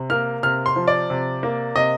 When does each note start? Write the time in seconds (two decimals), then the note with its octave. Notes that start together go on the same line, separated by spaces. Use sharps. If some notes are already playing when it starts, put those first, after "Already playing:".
Already playing: C3
0.10 A#3 F6
0.43 C3 F6
0.66 C6
0.76 F3
0.88 D5
1.10 C3
1.43 A#3
1.76 C3 D#5